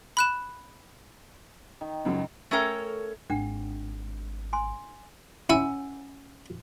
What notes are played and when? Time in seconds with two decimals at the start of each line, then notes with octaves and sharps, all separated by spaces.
0.17 B5 F#6 E7
1.81 D#3
2.05 C#2 F#2 F#3
2.51 A3 C#4 A4 A#4 C#5 G5
3.30 G#1 D4 F#5 G5
4.53 G#5 C6
5.50 C#4 E4 F#5 G#5 E6